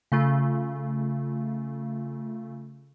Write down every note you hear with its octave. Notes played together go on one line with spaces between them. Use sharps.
C#3 A3 F4